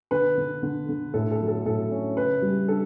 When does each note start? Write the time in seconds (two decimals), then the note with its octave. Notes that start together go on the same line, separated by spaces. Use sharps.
0.11 D3 B4
0.37 D3
0.63 D3
0.89 D3
1.14 A2 A4
1.31 A4
1.40 F#3
1.48 A4
1.65 A2 A4
1.91 C#4
2.17 C#3 B4
2.42 G3
2.68 D4 A4